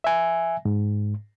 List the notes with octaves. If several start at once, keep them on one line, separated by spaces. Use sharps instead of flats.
E5 G#5
G#2